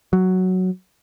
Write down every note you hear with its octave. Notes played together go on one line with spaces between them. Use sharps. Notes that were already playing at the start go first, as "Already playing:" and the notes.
F#3